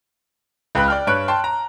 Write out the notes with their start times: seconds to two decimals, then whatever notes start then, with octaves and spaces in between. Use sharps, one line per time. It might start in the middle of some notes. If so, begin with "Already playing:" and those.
0.75 C#2 B4 G5 B5 F#6
0.88 D5 G5 F6
1.07 G2 B4 C#5 F#6 D7
1.28 G5 A5 C6
1.44 A#5